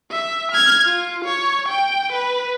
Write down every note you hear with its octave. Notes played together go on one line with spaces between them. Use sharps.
E5
F6 G#6
F4
C#5
G5
B4